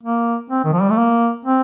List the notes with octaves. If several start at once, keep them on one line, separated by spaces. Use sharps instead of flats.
A#3
C4
D#3
F3
G3
A3
A#3
C4